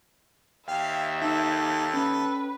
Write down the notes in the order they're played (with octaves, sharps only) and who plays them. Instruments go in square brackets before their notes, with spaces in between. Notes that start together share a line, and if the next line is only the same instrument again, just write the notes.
[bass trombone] D#2 [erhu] E5 [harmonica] F5 [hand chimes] G5
[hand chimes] D#4 [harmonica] A4
[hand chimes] C#4 [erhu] B4